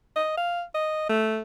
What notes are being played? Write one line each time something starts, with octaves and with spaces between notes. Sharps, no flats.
D#5
F5
D#5
A3